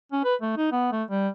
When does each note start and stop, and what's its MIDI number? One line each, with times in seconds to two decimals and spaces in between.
0.12 0.23 61
0.24 0.35 71
0.42 0.54 57
0.57 0.71 63
0.72 0.88 59
0.92 1.03 57
1.10 1.28 55